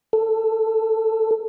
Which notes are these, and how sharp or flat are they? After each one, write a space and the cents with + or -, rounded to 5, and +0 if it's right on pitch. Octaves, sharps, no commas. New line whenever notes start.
A4 +15